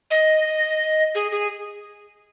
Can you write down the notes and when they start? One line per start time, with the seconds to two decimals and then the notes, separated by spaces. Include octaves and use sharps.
0.11 D#5
1.15 G#4
1.32 G#4